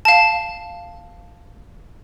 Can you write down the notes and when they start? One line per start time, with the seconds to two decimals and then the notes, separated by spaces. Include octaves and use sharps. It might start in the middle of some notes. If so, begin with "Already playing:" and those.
0.05 F5 A5